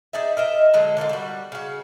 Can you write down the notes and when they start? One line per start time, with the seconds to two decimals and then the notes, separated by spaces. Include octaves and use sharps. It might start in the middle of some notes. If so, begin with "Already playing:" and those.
0.13 D#4 G#4 D5 E5
0.37 A#4 D#5 E5
0.74 D3 F#3 G#3
0.97 D3 A#3 E4 F4
1.09 G3 F#4
1.52 C#3 F#4